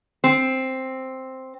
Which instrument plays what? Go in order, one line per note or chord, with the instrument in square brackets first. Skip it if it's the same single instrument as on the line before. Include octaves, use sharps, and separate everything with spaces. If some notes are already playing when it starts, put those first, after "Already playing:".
[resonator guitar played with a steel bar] C4